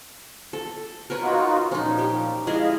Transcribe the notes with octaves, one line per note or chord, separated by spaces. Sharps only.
A4
A#4 B4 C#5
D#4 F4 F#4
A#2 F3 C#4 D#4
G4
G#3 E4 G#4 D#5 F5